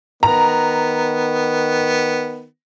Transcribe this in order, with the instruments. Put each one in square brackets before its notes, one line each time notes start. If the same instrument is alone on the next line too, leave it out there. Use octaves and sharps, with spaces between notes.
[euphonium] D#3 [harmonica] B3 [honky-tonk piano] A#5